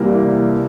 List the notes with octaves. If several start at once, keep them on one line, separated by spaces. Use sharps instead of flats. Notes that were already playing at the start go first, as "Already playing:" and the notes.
Already playing: C2 C3 E3 G3 A#3